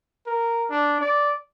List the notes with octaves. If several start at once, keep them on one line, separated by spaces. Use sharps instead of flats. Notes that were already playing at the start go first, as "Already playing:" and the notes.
A#4
D4
D5